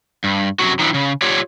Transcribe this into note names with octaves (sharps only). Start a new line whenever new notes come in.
G2
F#2 C3 E3 F#3 C4 F#4
D#3 F3 D4 E4
C#3
F4 G4 C#5 D5